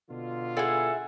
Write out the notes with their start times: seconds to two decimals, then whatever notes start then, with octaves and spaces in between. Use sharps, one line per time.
0.10 B2 D3 F4
0.57 E4 G#4 A4 F#5 G#5